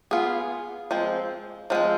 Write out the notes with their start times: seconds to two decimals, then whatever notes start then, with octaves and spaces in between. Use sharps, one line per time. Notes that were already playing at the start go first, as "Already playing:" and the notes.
0.11 B3 F4 G#4
0.91 F3 G#3 C4
1.70 F3 G#3 C4